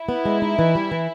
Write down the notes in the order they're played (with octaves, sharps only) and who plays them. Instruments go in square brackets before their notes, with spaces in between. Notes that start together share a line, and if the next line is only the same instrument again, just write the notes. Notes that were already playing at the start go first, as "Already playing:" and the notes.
Already playing: [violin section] E4
[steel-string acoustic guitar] B3
G#3
D#4
E3
G3
E3